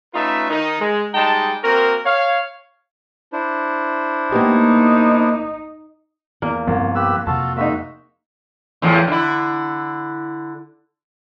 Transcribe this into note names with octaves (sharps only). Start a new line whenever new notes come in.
A3 C#4 D#4 F4 B4 E5
D#3 D#4
G#3
G3 G#3 D#4 G5 A5
A#3 C4 F#4 A#4
C#5 F5
D4 E4 C5
A#3 B3 D#4 G4
E2 A#3
C2 G2 F3 B3
G4 B4 E6
F2 C3 F4 F#4 A4 A5
G#3 A#3 D#4 F#4 E5
E2 A2 F3
D3 E4